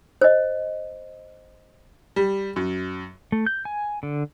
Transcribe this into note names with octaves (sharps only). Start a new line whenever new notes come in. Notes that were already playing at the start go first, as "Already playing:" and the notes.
C5 D#5
G3
F#2
A3
G6
G#5
D3